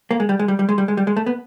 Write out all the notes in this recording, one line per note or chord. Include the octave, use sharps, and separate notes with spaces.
A#3
G#3
G3
G#3
G3
G3
G#3
G3
G#3
G3
G#3
A3
B3